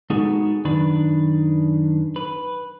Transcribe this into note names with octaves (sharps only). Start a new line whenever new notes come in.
G#3 B3 D#4 F#4 G#4 A4
F#2 D#3 D4 B4
B4